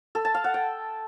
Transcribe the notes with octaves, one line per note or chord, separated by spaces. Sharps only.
A4
A5
F5
F#5
G5